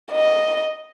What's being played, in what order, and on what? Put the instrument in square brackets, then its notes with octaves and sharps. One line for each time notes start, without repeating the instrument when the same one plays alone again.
[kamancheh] D#5